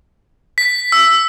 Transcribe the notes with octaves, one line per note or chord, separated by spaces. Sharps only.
B6
E6